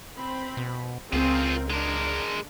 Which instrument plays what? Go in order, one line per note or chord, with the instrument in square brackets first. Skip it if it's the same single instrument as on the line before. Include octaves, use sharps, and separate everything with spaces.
[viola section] C4 B5
[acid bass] B2
[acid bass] C#2 [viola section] C4 A#4 [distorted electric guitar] F4 G#4
[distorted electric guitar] G#3 A#4 [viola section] D4